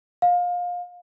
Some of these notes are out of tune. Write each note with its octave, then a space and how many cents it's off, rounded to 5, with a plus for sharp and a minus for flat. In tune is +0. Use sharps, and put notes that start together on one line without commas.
F5 +25